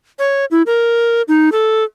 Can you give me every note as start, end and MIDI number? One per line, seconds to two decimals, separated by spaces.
0.19 0.45 73
0.51 0.62 64
0.66 1.22 70
1.28 1.50 63
1.52 1.84 69